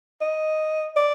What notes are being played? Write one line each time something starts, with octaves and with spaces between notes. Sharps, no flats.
D#5
D5